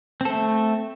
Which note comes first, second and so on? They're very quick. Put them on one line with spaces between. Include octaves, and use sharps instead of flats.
C4 A4 A3